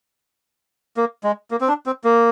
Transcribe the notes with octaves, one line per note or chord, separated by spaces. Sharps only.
A#3
G#3
A#3
C4
D4
C4
A#3